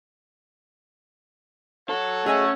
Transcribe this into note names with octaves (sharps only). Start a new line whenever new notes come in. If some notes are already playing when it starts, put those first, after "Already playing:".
A4 C#5 F#5
A3 C#4 G#4 D#5 G#5